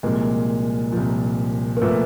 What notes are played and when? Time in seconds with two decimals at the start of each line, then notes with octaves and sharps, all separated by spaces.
0.03 C2 A#2 F3 G#3 A#3
0.92 C2 A#2 F3
1.77 A#3
1.81 A#2 F3 A3 B3